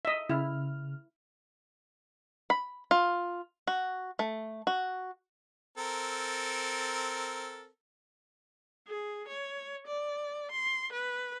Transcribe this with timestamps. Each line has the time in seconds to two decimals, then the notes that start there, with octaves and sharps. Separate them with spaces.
0.05 D#5 E5
0.30 C#3 E4 F6
2.50 B5
2.91 F4
3.67 F#4
4.19 A3
4.67 F#4
5.78 C4 A4 A#4
8.88 G#4
9.28 C#5
9.87 D5
10.52 C6
10.93 B4